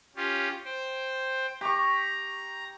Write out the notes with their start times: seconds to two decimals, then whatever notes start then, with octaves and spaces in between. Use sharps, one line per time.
0.16 C#4 F4 G4
0.65 C5 G5
1.61 G4 A#5 C#6